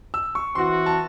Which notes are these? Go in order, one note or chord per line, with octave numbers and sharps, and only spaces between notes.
E6
C#6
E3 C4 F#4 C6
A5